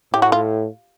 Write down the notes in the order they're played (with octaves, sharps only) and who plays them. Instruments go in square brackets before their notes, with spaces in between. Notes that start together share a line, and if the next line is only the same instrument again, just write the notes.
[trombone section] A2 [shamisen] G4
[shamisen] F#4
F4